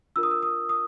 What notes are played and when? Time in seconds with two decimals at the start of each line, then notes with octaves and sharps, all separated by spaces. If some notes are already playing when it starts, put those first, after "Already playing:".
0.16 D4 F4 A#4 E6
0.23 D#6
0.31 E6
0.42 D#6
0.69 D#6